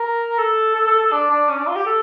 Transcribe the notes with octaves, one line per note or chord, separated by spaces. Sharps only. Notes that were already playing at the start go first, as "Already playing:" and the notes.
Already playing: A#4
A4
A4
A4
A4
D4
D4
C#4
D4
F4
G4
A4